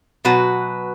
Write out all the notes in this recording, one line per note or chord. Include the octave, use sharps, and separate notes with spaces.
B2 F#3 F#4 B4